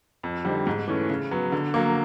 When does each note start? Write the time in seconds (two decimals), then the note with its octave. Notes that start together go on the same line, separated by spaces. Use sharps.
0.23 F2
0.45 D3 G3 C4 D#4
0.67 G#2
0.88 E3 A3 C#4
1.10 C#3
1.31 F#3 B3
1.52 D3
1.74 F#3 A#3